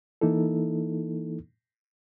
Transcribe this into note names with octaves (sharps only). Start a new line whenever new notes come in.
E3 A#3 D#4 E4 A4